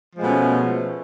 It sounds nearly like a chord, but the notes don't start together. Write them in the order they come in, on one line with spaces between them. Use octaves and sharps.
F3 G#3 A3 B2 C#4